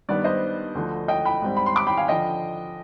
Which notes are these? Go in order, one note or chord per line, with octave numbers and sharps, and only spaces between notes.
G2 D#3 G3 B3 D5
C5 D#5
D2 D3 F3
D#5 G5
G5 B5
G#2 G3 C4
B5
C6
B5 D6
G5 B5
F5 G#5
D3 F3 D#5 G5